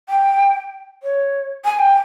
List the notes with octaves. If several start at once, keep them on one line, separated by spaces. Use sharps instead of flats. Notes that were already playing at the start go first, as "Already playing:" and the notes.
G5
C#5
G#5
G5